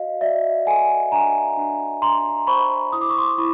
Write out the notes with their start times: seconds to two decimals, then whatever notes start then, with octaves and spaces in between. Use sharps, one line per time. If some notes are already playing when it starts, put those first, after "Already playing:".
Already playing: F#4 C5 D#5 F5
0.21 F#4 D5 E5
0.66 A4 F#5 G#5
1.12 D4 G#5 A#5
1.57 D4
2.02 D4 A#5 C6
2.47 C5 B5 C#6
2.92 E4 D#6
3.01 D6
3.10 C#6
3.18 C6 D6
3.38 E4 B5 C#6